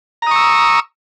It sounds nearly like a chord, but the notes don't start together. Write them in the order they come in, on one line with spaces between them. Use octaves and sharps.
A#5 D#6 C#6 E6